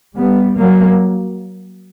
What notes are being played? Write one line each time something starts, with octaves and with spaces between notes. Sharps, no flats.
G3 B3
F#3 A#3